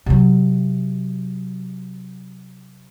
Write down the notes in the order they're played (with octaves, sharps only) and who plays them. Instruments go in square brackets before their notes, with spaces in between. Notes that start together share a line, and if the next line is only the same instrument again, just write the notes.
[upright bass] C3 F#3